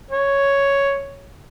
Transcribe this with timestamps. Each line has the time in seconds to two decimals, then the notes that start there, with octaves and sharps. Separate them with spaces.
0.11 C#5